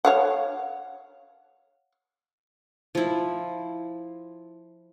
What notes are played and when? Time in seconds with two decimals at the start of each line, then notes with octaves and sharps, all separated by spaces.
0.05 C#5 F5 F#5
2.95 F3 E4